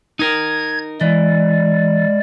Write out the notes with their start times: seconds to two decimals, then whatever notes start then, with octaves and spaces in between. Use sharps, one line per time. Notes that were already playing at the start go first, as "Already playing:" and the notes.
0.19 D#4 A#4 G#6
1.01 E3 G#3 D5